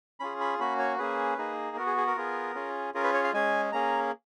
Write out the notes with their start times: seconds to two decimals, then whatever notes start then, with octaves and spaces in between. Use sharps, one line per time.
0.20 C#4 F4 G#4 B5
0.40 B5
0.59 A#3 C#4 F#4 B5
0.79 C#5
0.98 A#3 C#4 G#4 B4
1.38 A#3 D#4 G#4
1.76 B3 F#4 A#4
1.86 G#4
1.97 G#4
2.07 A#4
2.17 B3 F4 G#4
2.55 C#4 F4 G#4
2.94 C#4 F4 G#4 A#4
3.04 B4
3.14 C#5
3.24 F5
3.33 G#3 C#4 G#4 G#5
3.72 A#3 C#4 G#4 A#5